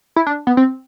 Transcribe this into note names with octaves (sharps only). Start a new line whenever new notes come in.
E4
D4
B3
C4